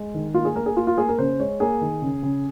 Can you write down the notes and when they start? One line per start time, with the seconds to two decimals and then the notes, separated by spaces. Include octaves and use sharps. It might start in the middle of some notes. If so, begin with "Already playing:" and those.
Already playing: G#3
0.14 D#3
0.34 A#3 F4
0.45 G#4
0.56 A#3 A#4
0.66 G#4
0.76 A#3 F4
0.87 F4
0.98 A#3 G#4
1.09 A#4
1.18 C#3 C5
1.40 G#3 C#5
1.60 A#3 G#4
1.81 D#3
2.02 C#3
2.23 C#3